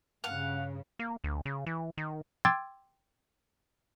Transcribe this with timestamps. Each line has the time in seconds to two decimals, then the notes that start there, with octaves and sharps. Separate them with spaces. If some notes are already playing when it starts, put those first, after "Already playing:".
0.24 G2 C#3 F5 F#5
0.99 A#3
1.24 D2
1.45 C#3
1.66 E3
1.97 D#3
2.45 G5 C6 D6 E6 G#6 A6